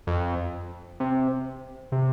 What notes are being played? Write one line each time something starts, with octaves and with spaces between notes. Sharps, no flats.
F2
C3
C3